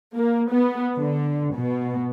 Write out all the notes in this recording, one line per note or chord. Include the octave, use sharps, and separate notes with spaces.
A#3
B3
D3
B2